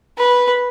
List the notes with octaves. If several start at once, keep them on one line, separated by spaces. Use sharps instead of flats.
B4